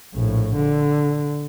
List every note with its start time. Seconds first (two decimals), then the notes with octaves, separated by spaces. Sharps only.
0.15 A#1 A2
0.56 D3